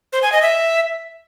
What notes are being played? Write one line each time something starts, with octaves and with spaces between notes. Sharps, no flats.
C5
G#5
D#5
E5